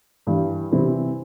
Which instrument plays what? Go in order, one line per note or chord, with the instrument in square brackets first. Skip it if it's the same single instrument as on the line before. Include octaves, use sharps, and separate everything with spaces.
[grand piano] G2 E3 G3
C3 E3 G3 C4 E4